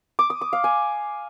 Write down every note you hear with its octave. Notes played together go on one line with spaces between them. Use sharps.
D6
D#6
D6
F5
G#5